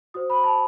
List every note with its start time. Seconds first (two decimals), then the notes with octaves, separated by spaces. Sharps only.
0.14 F#4 C5 D#6
0.30 B5
0.44 A5